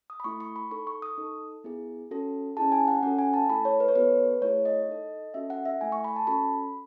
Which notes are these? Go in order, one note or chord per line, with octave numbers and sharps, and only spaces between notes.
D#6
B5
A3 E4 A4 C#6
C#6
B5
D#4 A4 C#6
C#6
D#6
D#4 A4
B3 E4 G#4
C#4 F#4 A4
C#4 E4 G#4 A5
G#5
F#5
C#4 F#4 A4 F#5
G#5
A5
A3 E4 A4 B5
C#5
B4
C#5
B3 F#4 A4 B4
A3 E4 G#4 C#5
D#5
D#4 A4
C#4 F#4 A4 E5
F#5
E5
A3 E4 A4 G#5
C#6
B5
A5
C#4 F#4 A4 B5